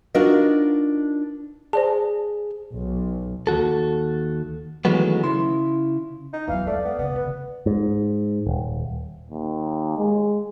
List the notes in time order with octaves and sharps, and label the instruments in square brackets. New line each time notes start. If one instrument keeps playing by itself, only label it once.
[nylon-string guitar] D4 D#4 F4 F#4 A#4 D#5
[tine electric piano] G#4 [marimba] C5 D5 A5
[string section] B1
[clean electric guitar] D#2 B2 F#4 A4
D#3 E3 F#3 G#3 A3 B3
C#3 E4 C6
[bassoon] D#4
[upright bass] E2 F#3 [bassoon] E3 [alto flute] F5
[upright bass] G#3 [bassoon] A3 [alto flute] D5
[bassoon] B3
[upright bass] D#2 C#3 [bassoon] B3
[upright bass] E2 D3 [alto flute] B4
[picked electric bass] G#2
D#1
[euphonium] D#2
G#3